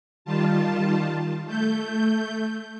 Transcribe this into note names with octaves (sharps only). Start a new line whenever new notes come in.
D#3 G3 F4 A5
A3 G6